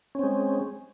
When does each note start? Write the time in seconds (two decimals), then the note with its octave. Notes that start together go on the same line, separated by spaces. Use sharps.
0.15 C#4
0.19 C4
0.23 G#3